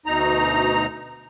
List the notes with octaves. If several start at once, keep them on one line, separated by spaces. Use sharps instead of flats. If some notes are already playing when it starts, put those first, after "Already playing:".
D2 B2 D#4 A#5